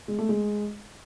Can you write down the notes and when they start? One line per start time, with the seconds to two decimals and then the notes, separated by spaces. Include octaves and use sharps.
0.08 G#3
0.19 A3
0.29 G#3